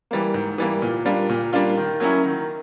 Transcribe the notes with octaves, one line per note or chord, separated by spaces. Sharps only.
E3 G3 A#3
G#2
E3 G3 A#3
A#2
G3 A#3 D4 F4
A#2
G3 A#3 D4 F4
D#3
F#3 A#3 C#4 E4
D#3